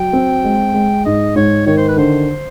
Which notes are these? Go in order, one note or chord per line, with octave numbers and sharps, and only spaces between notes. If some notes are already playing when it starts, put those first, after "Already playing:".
Already playing: F#3 G5
C4
G#3
G#3
G#2 D#5
G#2 C#5
D#3 C#5
C5
B4
D3 C5